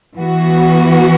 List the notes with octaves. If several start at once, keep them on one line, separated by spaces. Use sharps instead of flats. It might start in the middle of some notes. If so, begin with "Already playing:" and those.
E3 B3 F#4